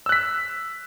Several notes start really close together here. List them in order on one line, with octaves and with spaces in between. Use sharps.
E6 F#6 B6